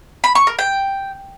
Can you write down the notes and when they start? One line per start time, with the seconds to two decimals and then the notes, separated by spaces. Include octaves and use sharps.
0.24 B5
0.35 C#6
0.47 A#4
0.59 G5